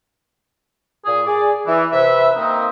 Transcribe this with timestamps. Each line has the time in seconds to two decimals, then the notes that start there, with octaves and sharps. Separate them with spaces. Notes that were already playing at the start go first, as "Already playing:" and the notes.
1.05 A#2 G#4
1.26 G#4 D5
1.66 E3
1.91 C3 B4 E5
2.36 A#3 C4 D#4